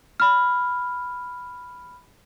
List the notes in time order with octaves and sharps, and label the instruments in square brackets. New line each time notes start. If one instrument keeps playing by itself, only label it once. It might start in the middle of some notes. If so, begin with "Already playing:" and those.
[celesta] B5 F6